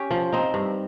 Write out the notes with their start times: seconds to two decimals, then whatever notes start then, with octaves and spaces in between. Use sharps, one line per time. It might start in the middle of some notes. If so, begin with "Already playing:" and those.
Already playing: C#4 G4
0.11 F3
0.33 C4 D#4
0.54 G2